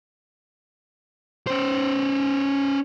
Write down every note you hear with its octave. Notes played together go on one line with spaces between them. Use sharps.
C#4 C5